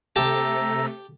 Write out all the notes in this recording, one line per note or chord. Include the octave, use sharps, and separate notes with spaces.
C3 A3 G4 A5 A#5 E6 A#6